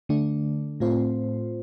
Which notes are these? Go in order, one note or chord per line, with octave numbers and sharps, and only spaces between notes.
D3 A3 D4
A2 A3 C4 F4 C5